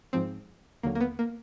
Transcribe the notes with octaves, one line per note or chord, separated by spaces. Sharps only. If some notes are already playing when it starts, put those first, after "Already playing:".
G#2 F3 C4
D#2 D3 F#3 A#3
A#3
B3
A#3